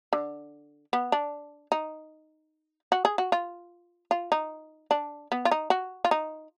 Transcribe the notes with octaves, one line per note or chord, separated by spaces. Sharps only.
D3
B3
D4
D#4
F#4
G#4
F#4
F4
F4
D#4
D4
B3
F4
D#4
F#4
F4
D#4